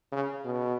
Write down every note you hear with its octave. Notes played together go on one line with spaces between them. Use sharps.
C#3
B2